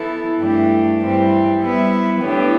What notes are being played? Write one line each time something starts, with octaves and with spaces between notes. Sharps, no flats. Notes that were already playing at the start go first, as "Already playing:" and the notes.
Already playing: E3 B3 E4 A4
G2 E3 A3 D4 G4
G2 E3 G3 C4 G4
G3 B3 E4 B4 E5
A2 E3 B3 D4 G4